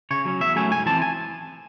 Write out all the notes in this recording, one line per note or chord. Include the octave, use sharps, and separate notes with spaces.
C#3 C#5
F#3 C#4
E2 E5
C#3 F#3 A3 C#4 G#5
G#2 G#5
E3 C4 A5
G#5